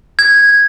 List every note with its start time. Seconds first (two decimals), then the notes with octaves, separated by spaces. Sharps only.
0.19 G#6